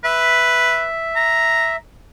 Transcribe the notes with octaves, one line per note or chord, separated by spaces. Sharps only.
B4 E5
A#5